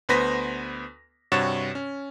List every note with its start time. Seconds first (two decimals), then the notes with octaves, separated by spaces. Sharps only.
0.09 D2 B3 B4 C5 A#6 B6
1.32 G2 C3 F#4 C#5 A6 E7
1.75 C#4